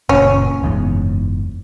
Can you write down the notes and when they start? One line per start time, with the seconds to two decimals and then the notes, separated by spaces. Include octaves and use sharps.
0.09 F#1 A#2 C#4
0.63 F#1 E2 G#2